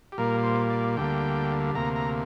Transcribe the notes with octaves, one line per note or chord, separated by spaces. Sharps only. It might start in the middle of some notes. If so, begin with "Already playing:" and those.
G4
A#2 G3 A#3 A#4
C5
D5
D2 D3 G3 A#3 G5
D2 C3 A#3 A#5
A#5